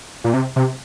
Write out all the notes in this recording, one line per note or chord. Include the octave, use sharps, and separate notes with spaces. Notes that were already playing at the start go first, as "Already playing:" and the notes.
A#2
C3
C3